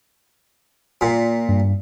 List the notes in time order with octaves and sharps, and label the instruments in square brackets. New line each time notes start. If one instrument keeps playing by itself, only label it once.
[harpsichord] A#2
[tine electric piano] G2